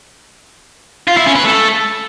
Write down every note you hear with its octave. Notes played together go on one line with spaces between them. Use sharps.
F4
E4
C#4
B4
A3